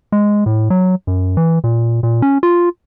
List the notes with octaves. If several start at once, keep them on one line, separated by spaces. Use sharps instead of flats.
G#3
A2
F#3
F#2
E3
A#2
A#2
C#4
F4